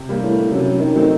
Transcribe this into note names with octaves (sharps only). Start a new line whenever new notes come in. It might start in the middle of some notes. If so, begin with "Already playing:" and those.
Already playing: C3
G3 A#3 D4
A2
F#2 C3
D#3
F#3 A3 C4 D#4